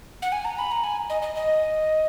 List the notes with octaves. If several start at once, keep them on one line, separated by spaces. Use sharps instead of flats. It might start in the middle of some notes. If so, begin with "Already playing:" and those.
F#5
G#5
A#5
B5
A#5
G#5
D#5
D#5
D#5